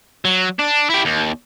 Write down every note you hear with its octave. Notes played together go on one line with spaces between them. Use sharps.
F#3
D4
E4 G4
D#2